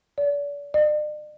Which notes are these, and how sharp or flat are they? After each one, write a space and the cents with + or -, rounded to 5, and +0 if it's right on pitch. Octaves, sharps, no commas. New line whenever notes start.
D5 -40
D5 +45